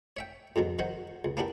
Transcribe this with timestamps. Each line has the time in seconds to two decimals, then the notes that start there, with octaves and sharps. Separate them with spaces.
0.17 C#5 E5 G5
0.56 F2 G#2 B2 F#3
0.79 D#3 F#3 F#4 C5 C#5
1.25 C#2
1.37 A#3 B3 C#4 D4 E4 G4